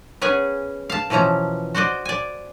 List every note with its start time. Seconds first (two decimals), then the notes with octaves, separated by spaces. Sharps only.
0.22 B3 C#4 G#4 G#5
0.90 F5 A5
1.10 B2 E3 F3 C#4 A#5
1.75 F#4 C5 D5 D#5
2.05 D5 G#5